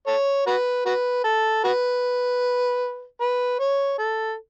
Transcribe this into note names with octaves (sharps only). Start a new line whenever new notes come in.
A4 C#5
F#4 B4
F#4 B4
A4
F#4 B4
B4
C#5
A4